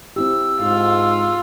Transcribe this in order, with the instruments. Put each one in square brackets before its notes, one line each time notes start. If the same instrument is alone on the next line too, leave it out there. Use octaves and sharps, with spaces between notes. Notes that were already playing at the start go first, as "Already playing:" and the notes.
[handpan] C4 E4 G4 [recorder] E6
[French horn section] G#2 [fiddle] F4